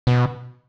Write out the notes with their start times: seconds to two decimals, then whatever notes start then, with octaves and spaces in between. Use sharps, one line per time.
0.07 B2